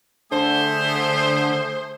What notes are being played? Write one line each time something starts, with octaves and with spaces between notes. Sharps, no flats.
D3 A3 G#4 C5